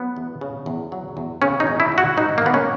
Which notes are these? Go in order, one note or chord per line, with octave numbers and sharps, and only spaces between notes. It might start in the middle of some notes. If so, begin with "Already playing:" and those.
Already playing: F#3 B3
E2
C#3
E2
F#3
E2
C#3 C#4
D#4
E2
E4
F#3
F#4
G#2 D#4
A#3
D#3 B3
C#4